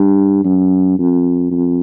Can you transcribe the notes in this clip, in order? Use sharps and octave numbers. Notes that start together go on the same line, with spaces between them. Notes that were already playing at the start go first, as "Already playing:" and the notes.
Already playing: G2
F#2
F2
F2